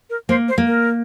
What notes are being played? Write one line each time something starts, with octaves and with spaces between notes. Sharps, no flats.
A#4
A#3 C5
C5
A#3
A#4